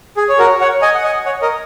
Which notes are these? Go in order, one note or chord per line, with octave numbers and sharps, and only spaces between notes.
G#4
C#5
F#4 A#4
C#5 F#5
D#5 G#5
F#5
D#5 G#5
C#5 F#5
A#4 D#5